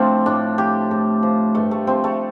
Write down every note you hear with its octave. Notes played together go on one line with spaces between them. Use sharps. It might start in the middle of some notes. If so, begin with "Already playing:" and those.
Already playing: A2 F3 A3 C4 D4 F4
A2 D4
F3 G4
A2
F3
G2 A3
A3
F3 C4
A3